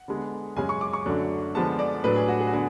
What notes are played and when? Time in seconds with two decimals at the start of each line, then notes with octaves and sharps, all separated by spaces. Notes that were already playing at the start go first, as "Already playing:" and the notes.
Already playing: F#5
0.08 D3 G#3 B3
0.56 F#2 C#3 G#3 C#4 G#5
0.69 C#6
0.81 D6
0.93 C#6
1.05 F#2 D3 F#3 A3 D4
1.55 D3 F3 G#3 B3 A5
1.79 D5
2.04 A2 F#3 A3 D4 B4
2.16 G#4
2.28 F#4
2.40 G#4
2.47 F#4
2.52 D3 B3 D4 G#4